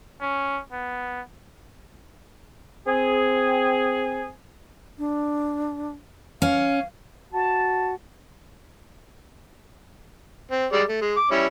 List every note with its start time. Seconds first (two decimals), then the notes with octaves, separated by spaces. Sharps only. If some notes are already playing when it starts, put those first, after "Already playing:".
0.21 C#4
0.72 B3
2.86 C4 G#4
4.98 D4
6.42 C#4 F5
7.33 F#4 A5
10.51 C4
10.72 G3 G#3 D5
10.89 A3
11.01 G#3
11.16 D6
11.31 G3 C#4 E4